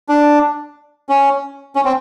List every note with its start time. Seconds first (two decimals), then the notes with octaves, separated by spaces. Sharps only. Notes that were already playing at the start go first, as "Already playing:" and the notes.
0.09 D4
1.09 C#4
1.76 C#4
1.85 C4